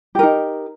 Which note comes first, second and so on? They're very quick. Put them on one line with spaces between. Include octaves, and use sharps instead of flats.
G4 A#4 D#4